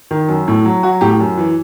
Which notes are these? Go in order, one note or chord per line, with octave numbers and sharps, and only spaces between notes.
D#3
F#2
A2
F#3
F#3 F#4
A2 G4
F#2
E3